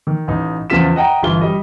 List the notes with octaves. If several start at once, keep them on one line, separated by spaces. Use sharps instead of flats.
D#3
A1 D#4
E2 C#3 F3 F4 B6 E7
D#5 F#5 G5 A#5
G1 E3 F4 G7
G3 D#5